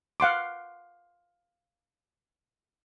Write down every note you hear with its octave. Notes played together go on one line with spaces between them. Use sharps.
F5 F#5 C6 D6